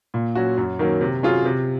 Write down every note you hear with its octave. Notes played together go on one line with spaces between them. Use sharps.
A#2
F#3 C#4 F#4
F#2
D#3 F#3 A#3 C#4
C3
F#3 C#4 F4 G#4
C3